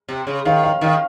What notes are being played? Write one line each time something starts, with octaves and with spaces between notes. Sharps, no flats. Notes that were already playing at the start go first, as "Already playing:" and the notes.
C3
C#3
D#3 F5
F5
D#3 F5